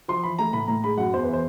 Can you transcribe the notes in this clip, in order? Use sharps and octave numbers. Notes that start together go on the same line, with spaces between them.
F3 C6
E3 B5
A3 A#5
A2 B5
A2 A#5
G#3 B5
F#2 F#5
E2 C5
B4
E3 C5